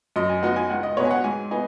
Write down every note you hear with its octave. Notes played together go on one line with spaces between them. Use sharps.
F#2 D#5
G#5
F#3 B3 D#4 F#5
G#5
C#2 F#5
D#5
B2 B3 C#5
G#5
F#5
G#2 G#5
B3 D#4 G#5